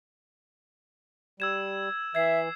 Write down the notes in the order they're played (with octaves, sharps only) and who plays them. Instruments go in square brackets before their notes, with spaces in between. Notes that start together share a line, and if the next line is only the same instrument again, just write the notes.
[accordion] G3 [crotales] E6 G#6 E7
[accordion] E3 [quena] E5 [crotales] G#6 C7